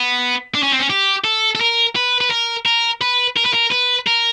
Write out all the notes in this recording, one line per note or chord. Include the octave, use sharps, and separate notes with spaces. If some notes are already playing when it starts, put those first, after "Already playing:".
Already playing: B3
D4
C#4
C4
C#4
G4
A4
A4
A#4
B4
B4
A#4
A#4
B4
A#4
B4
A#4
B4
A#4